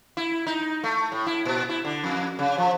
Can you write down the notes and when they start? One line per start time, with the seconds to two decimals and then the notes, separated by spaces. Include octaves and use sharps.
0.17 E4
0.47 D#4
0.84 A3
1.12 A2
1.27 E4
1.45 A#2
1.69 E4
1.85 D3
2.04 F2
2.39 C#3
2.58 F3